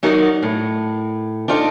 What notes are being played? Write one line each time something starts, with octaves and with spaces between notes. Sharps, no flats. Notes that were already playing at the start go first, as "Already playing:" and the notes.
F#3 D#4 F#4 A#4 D5 D#5
A2
D4 D#4 F4 A4 C#5 D5